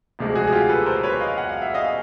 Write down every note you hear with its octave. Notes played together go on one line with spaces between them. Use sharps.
E1 D2 C3 F3 G#3
F#4 G#4
G#4
F4 G4
A4 B4
A#4 C5
B4 C#5
D#5 F5
F#5
F5
E5
D#5 F5